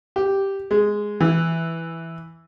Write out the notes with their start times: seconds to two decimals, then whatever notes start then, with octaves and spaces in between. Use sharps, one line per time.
0.16 G4
0.71 G#3
1.20 E3